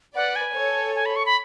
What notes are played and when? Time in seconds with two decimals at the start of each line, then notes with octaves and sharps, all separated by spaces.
0.15 B4 D5 F#5
0.36 G#5
0.55 A4 C#5
0.96 G#5
1.06 B5
1.16 C#6
1.26 B5